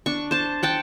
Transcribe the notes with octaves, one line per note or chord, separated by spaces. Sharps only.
D4 C#6
C5 A5
F#5 G5 A5